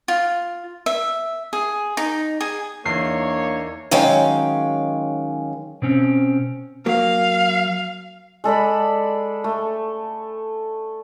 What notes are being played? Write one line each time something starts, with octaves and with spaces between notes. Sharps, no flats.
F4
E5
G#4
D#4
G#4
E2 A#3 D4 D#4 C#5 C7
D#3 F#3 G#3 C#4 F5 G5
B2 C4 C#4
F#3 A#3 F5
G#3 A4 D5 B5
A3